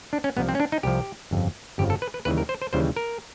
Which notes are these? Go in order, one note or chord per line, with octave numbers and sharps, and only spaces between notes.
D4
C#4
C2 C3 F3 B3
C4
C#4
D4
D#4
C2 C3 F3 G4
G1 F2 C#3 F3
G1 F2 C#3 F3 G4
A4
B4
B4
D#2 C#3 E3 G3 B4
A#4
C5
C5
D#2 C#3 E3 G3 C5
A#4